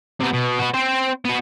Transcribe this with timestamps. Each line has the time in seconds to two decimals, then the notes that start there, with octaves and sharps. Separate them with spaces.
0.20 C3 B3
0.33 B2
0.59 B3 F#4
0.74 C4 C5
1.25 B3 F#4